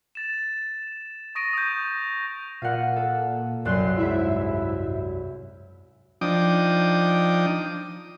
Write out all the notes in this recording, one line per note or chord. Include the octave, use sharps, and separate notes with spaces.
A6 E7
C#6 D#6 A#6 D7 D#7
D#6 G6
A#2 F5 F#5
A4
C2 F#2 C6 F#6
G#2 E4 E5
F3 D4 D#4 G5 D6 D#6